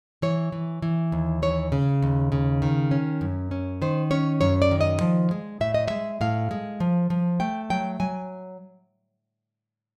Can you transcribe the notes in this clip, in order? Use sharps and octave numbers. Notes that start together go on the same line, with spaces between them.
E3 C#5
E3
E3
D#2
E3 C#5
C#3
D#2
C#3
D#3
C#4
F#2
C#4
D#3 C5
C#4 C#5
F#2 C#5
D5
D#3
D#5
F3
G#3
A2 E5
D#5
G#3 E5
A2 F5
G#3
F3
F3
A3 G5
F#3 G5
F#3 G#5